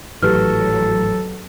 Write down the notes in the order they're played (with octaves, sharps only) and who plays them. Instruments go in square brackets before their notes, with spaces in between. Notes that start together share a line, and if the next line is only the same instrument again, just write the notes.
[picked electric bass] G#1 A2 E3 [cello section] F#3 [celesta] G4 B4 F6 [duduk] A4